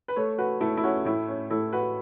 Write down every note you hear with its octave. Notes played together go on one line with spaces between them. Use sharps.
B4
A3 A4 C#5
F#4 B4
A3 E4 A4
E4
C#4 F#4
A2 E4
C#4
A2 E4 A4
F#4 B4